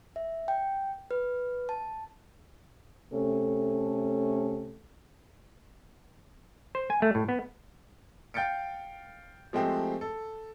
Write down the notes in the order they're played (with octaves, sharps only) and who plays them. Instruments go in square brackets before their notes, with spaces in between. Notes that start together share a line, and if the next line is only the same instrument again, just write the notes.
[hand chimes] E5
G5
B4
A5
[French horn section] C3 A3 C#4 A4
[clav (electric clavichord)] C5
G#5
A3
A2
B3
[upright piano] F5 G5 G6 A6 C#7 D7
F3 G#3 A3 C4 G4
A4